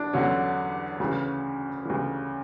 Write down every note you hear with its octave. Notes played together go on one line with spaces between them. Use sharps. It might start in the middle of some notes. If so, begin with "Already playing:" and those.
Already playing: E2 D4 E4
E2 D3 F#3 C#4
D2 C#3 E3
D2 C#3 E3